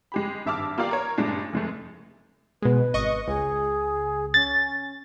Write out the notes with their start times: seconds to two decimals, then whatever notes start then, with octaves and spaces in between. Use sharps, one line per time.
0.12 G#3 G4 B5
0.45 G#1 G2 E5 A5 D6 F6
0.78 A#3 F4 G4 D5 F5
0.91 A#4 C#5
1.18 G2 A#2 C#3 G#3 A3 D4
1.53 F1 G#3 A3
2.62 B2 G#3 B4
2.94 G#1 D#5 C#6
3.28 C#2 G#4
4.34 C#4 A6